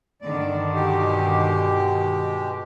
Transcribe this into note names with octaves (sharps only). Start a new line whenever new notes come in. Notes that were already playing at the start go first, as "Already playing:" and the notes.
G2 D3 D#3 D5
B2 G#3 G4